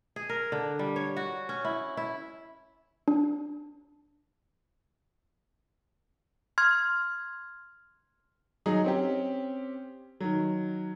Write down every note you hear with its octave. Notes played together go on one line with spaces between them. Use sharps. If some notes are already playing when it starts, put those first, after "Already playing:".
G#4
A#4
D3
G3
C#5
F#4
C#4
E4
E4
D4
C6 F6 G#6
F#3 D#4 G#4
C4 C#4 G4
D#3 F#3